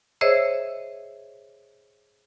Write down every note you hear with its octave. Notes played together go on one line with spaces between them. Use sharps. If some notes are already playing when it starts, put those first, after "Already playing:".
G#4 C5 C#5 D#5 E5 E6